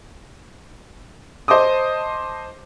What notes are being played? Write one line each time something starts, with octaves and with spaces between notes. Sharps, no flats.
C5 D#5 A5 D6 D#6